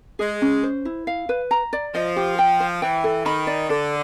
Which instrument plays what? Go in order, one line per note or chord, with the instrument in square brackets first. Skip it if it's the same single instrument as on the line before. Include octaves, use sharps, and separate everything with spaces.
[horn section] G#3 [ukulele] G#4
[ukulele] C#4
C5
E4
F5
B4
A#5
D5
[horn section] F3 [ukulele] D#5
[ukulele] G4
G5
C5
[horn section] E3 [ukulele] G5
[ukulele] A4
[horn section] D#3 [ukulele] B5
[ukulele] D5
[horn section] D3 [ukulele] A4